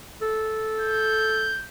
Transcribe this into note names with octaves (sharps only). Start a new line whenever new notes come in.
A4
G6